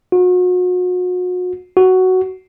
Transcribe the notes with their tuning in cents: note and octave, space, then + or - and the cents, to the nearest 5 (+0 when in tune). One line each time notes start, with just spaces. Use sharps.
F#4 -35
F#4 +10